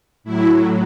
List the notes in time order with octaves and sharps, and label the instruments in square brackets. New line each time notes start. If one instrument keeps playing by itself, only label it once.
[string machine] A2 F#3 E4